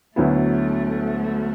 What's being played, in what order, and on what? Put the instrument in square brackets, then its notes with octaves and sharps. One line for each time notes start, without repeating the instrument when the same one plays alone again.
[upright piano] D2 D3 F#3 B3 E4 [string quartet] A3